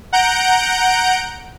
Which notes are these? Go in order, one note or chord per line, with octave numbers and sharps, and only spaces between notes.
F#5 A#5 G6 D7